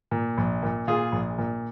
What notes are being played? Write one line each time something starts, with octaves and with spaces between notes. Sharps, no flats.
A#2
A#1
A#2
A#2 F4 G#4
A#1
A#2